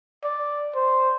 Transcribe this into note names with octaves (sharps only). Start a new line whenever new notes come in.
D5
C5